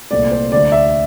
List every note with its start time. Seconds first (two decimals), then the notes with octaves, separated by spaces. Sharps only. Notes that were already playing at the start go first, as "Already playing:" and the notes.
0.11 C2 A#2 A3 C4 D5
0.31 C5
0.52 D2 D3 A3 D5
0.72 E5